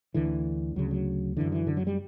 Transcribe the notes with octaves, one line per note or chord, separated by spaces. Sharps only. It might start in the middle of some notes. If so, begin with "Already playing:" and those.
D2 D3 E3
D2 C#3 F#3
F#3
F#2 D3 E3
E3
D3
F#3
G3